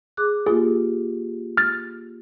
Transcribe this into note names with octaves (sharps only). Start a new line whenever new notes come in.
G#4 D6 F#6
A#3 F4 G4 G#4
F6 A6